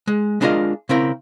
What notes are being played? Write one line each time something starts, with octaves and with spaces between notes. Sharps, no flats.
G#3
G#3 D4 E4 F4 A#4 D#5
C#3 C4 E4 A#4